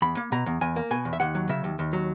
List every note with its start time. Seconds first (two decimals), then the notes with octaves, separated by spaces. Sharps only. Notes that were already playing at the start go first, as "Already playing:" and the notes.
0.02 E2 B5
0.17 A#3
0.32 B2 A#5
0.46 E2
0.61 E2 G#5
0.76 A#3
0.91 B2 G#5
1.05 E2
1.13 E5
1.20 D#2 F#5
1.35 F#3
1.49 C#3 E5
1.64 D#2
1.79 D#2
1.93 F#3